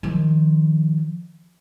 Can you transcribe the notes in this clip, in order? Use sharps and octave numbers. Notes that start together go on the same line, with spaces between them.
D#3 F3